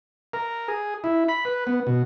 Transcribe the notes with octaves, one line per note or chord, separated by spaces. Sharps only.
A#4
G#4
E4
B5
B4
B3
B2